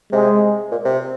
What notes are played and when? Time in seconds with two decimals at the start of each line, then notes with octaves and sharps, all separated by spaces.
0.12 C3 G#3
0.71 A#2
0.85 C3